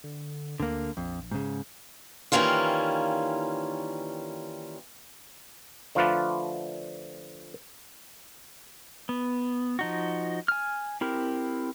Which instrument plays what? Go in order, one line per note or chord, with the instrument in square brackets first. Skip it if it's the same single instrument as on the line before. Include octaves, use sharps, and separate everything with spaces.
[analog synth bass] D3
[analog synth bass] D2 [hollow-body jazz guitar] D3 A#3
[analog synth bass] A#1 [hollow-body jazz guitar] F2
[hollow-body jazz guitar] G#2 C#3
[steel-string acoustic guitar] D#3 E3 G3 A#3 C#4 F4
[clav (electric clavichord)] D3 F3 A3 F4 B4 D5
[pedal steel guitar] B3
F3 D#4 F#4
G#5 F6
C4 E4 G4 A#4